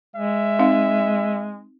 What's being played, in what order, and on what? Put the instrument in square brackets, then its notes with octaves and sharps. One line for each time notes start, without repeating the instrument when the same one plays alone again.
[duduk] G#3 [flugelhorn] E5
[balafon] C4 D#4 F5